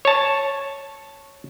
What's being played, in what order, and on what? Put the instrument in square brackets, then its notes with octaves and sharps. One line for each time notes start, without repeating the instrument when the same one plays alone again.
[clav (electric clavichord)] C#5 A5